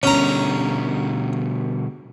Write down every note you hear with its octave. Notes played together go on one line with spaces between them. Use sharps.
B2 D3 G3 C#4 A#5